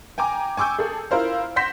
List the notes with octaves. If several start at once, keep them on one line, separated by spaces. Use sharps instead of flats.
G5 G#5 A#5 D6
G#5 C#6 D6 E6 G6
G#4 A4
E4 F4 A#4 C5 F5
F#5 C6 G6 A#6 B6 E7